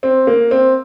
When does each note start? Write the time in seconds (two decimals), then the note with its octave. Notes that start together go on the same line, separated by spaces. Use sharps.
0.03 C4
0.27 A#3
0.51 C4